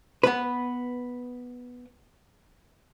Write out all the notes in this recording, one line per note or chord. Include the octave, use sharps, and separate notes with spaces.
B3 B4